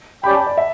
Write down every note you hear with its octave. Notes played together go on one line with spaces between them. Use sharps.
C#4 G4 D5 G5 B5
A5
D5
E5